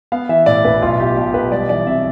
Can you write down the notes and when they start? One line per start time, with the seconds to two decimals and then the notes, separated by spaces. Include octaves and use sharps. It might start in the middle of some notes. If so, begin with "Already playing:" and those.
0.12 B3 F5
0.29 E3 E5
0.46 A2 D5
0.65 A1 B4
0.82 B1 F4
0.99 B3 G4
1.17 B2 G4
1.34 B1 B4
1.52 G3 D5
1.69 E3 D5
1.87 C3 E5